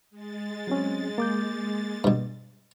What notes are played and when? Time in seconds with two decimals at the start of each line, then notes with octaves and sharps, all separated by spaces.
0.10 G#3 A6
0.67 F#3 C4 C#4
1.18 A#3 D6 G6
2.04 G2 B2